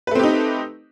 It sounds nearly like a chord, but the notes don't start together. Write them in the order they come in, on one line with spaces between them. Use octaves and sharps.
B4 A3 C4 G4 D#4